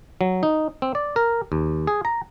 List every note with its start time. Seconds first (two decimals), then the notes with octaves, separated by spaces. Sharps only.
0.21 F#3
0.43 D#4
0.82 C4
0.95 D5
1.16 A#4
1.52 D#2
1.87 G#4
2.05 A#5